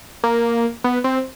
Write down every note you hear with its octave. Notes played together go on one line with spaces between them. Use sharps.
A#3
B3
C4